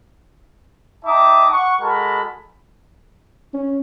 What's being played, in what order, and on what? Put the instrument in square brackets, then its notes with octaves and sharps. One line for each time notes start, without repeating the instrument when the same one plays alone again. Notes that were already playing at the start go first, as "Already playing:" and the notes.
[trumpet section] D#4 E5 G5 A5 D6 D#6
F#5 C#6
G#3 F#4 A4 A#4 A5 B5
[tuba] C#4